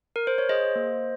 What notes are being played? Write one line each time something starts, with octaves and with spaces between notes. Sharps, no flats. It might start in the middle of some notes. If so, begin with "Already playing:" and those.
A#4
C5
C#5
G#4 C5 D#5
A#3